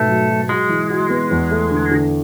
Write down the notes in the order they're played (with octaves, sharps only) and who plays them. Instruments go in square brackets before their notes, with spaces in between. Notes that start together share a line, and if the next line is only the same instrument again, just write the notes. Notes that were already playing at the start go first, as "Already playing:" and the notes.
Already playing: [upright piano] G#2 B2 B3 [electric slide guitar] A3
[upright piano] F#3
F#3
[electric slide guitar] G#3 [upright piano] F#4
[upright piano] E3
F#4
B3
E2
A3
D3
D3